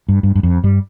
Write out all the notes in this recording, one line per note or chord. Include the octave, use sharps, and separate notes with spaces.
G2
G2
G2
F2
G2 G3